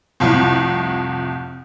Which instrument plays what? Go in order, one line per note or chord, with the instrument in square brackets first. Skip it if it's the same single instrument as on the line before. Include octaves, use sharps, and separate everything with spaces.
[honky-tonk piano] C2 F2 A2